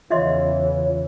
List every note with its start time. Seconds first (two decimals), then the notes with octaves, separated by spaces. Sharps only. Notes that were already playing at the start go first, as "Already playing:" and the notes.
0.11 E2 C#3 E3 F4 C#5 D#5 E5 C6